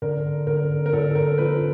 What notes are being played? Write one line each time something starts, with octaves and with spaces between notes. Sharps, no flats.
D3 A#4
D3 A#4
A#4
D3 A4
A#4
F3 B4